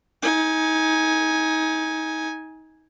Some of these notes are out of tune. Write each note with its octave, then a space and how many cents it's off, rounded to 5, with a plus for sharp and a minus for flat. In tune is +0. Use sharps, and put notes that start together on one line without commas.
D#4 +30 G#5 +0